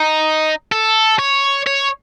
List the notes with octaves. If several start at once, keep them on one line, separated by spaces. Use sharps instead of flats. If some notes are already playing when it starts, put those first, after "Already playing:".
Already playing: D#4
A4
C#5
C#5